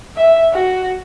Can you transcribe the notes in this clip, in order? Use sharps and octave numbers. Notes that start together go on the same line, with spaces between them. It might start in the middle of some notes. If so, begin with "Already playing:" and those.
E5
F#4